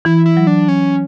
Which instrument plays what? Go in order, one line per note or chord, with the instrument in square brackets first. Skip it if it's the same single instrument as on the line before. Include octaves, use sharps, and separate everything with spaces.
[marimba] E3 [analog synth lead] E4
[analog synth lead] E4
[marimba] F#3
[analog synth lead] D4
C#4